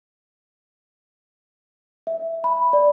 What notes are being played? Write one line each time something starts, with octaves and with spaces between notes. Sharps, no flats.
E5
B5
D5